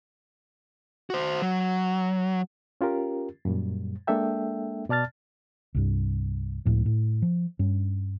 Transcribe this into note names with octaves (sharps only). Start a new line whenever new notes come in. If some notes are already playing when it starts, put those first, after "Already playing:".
F#4 C5
F#3
C#4 F4 G4 A#4
F#2 A#2 G3
G#3 A#3 D4 A4 E5 G5
B2 D5 A5 F6 A6
C2 G2
C#2 A2 F3
A2
F3
G2 C#4